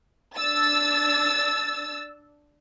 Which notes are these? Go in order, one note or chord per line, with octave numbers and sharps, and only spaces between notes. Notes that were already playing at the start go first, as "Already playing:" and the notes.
D4 E6 A6